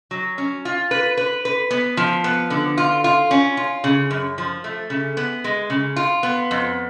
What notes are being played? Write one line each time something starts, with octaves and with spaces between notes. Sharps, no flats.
F#3
C#4
F4
B4
B4
B4
B3
F3
B3
D3
F4
F4
C#4
F4
C#3
F#2
F3
A3
C#3
B3
G#3
C#3
F4
B3
F2